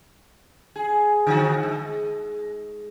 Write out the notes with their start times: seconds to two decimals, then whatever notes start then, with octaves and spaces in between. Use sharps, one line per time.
0.76 G#4
1.27 D3 F3 F#4
1.63 G#3